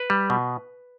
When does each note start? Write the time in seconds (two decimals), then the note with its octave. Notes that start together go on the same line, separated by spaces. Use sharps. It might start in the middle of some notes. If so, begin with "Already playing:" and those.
Already playing: B4
0.10 G3
0.30 B2